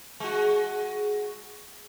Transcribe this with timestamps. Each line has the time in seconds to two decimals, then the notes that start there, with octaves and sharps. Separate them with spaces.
0.20 G#3 F#4